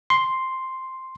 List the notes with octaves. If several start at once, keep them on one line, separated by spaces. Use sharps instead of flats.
C6